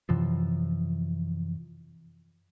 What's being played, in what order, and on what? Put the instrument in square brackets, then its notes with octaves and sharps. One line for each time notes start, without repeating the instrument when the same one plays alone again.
[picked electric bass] F#2 C3 E3 F3